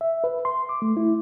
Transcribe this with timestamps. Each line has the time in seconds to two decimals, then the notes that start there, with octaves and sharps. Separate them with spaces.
0.01 E5
0.24 B4
0.45 C6
0.69 D6
0.82 A3
0.97 E4